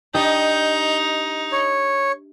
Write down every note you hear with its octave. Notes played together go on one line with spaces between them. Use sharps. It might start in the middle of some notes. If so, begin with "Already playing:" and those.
D4 D#4 G4 D#5 G6
C#5